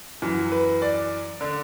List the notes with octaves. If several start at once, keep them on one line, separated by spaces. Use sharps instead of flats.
F#2 E3
B4
D5
D3